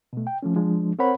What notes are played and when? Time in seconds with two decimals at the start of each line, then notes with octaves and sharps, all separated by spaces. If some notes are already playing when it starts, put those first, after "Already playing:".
0.13 B2 A3
0.27 G5
0.43 F3 A3 C#4
0.56 F3 G#3 D4
0.99 C4 A#4 C5 C#5 F#5 B5